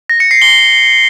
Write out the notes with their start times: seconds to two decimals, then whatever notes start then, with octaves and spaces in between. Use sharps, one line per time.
0.10 A#6
0.20 C#7
0.31 C7
0.42 G7